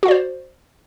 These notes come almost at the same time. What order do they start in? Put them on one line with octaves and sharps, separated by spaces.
F#4 F5 D5 C5